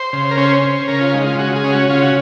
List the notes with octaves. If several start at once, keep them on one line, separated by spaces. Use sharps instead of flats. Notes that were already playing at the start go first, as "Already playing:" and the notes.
Already playing: C5
C#3
A#4
C#4 C5
C#4
C#3 A#4
F4
G#3 D#4
F4
C#3 F#4
G#4
C#4
F#4
C#3 F4
F#4